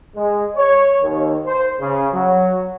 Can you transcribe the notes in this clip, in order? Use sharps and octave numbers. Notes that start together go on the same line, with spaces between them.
G#3
C#5
D#2
C5
C#3
F#3